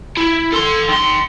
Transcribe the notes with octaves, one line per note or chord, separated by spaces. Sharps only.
E4
A4 C6
D#3 C6